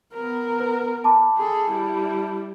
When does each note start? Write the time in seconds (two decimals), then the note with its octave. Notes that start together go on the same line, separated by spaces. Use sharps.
0.13 B3 A#4
0.60 B4
1.04 A5 B5 D6
1.37 G#4 A4
1.71 G3 E4